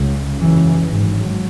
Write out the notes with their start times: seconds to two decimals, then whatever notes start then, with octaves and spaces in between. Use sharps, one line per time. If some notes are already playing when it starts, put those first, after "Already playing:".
Already playing: C#2 C#3
0.37 F#1 E2 C#3 E3
0.85 G#1 G#2 F#3